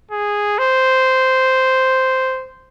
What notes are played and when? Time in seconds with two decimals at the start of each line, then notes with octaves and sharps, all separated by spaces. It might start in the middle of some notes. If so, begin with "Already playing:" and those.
0.11 G#4
0.58 C5